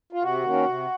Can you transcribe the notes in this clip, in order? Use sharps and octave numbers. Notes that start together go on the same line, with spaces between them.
F4
C3 F#4
D#3 A#3 C#4
C3